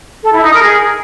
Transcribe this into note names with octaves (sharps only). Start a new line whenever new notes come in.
A4
E4
D#4
A#4
G#4